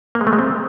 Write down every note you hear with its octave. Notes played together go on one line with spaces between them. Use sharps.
A#3
G#3
A3
G#3
C4